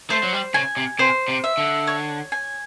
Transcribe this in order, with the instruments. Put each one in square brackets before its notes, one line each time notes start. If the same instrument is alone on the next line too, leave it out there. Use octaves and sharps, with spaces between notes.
[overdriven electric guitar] A3 [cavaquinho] C5
[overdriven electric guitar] F#3
G3
[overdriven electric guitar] C#3 [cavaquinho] G#5
[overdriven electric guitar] C3
[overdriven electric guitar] C3 [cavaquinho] C5
[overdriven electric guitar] C3
[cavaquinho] E5
[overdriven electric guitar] D3
[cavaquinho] C#5
G#5